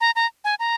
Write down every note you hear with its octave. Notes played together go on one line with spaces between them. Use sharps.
A#5
A#5
G#5
A#5